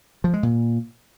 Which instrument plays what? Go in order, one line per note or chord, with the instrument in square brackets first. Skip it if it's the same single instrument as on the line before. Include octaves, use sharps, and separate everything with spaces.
[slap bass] F3
G#3
A#2